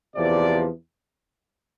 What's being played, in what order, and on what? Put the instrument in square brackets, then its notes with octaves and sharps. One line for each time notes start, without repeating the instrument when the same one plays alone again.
[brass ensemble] E2 C3 F3 D5